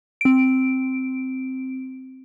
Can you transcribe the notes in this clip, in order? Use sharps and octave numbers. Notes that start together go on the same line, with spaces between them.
C4 D7